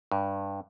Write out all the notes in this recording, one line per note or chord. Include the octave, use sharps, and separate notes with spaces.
G2